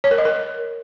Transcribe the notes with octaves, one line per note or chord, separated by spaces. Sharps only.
C#5
A#4
D#5
A#4